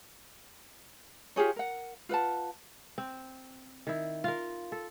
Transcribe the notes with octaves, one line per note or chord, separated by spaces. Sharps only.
F4 G4 G#4 C#5
A#4 F#5
F4 B4 F#5 A5
C4
D#3 E4
F4 A#4
A4